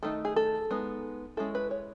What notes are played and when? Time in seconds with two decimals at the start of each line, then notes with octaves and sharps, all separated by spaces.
0.03 D#3 A3 D#4 A4
0.25 G#4
0.36 A4
0.71 G#3 B3 D#4
1.37 G#3 C#4 E4 A4
1.55 B4
1.71 C#5